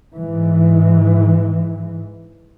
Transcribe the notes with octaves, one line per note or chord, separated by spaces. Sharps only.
G#2 E3